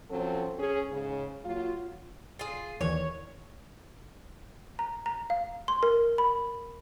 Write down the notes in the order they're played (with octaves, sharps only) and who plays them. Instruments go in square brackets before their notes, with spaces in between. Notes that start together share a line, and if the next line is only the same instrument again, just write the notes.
[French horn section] F3 F#3 C4 C#4 A4
C#4 G#4
G#2 C#3
F#3 A#3 F4
[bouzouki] F4 G#4
[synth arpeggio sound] D#2 D#3 E3 [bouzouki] C#5
[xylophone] A#5
A#5
F5
C6
A#4
B5